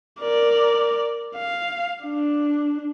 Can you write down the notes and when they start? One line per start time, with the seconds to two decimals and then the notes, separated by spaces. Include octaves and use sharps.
0.21 A#4 D5
1.35 F5
2.03 D4